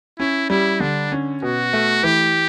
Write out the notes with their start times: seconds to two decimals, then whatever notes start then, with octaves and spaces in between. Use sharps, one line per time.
0.19 C#4 E4
0.50 G3 E4
0.80 D3 D4
1.12 C#4
1.42 B2 F#4
1.73 A3
2.03 E3 G4